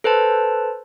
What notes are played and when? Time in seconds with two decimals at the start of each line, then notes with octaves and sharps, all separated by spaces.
0.04 A4 B4 C5 A5